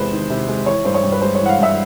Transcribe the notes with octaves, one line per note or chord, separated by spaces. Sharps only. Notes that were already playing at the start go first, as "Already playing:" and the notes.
Already playing: E2 C3 G#3 B4 C5
D#3
C3
G#3
E3 C#5
G2 C5
C#5
G2
B4
G#3 C5
C#5
E3 F#5
F5
G2 E5